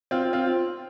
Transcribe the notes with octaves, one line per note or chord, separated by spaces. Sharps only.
C4 F4
C4 F4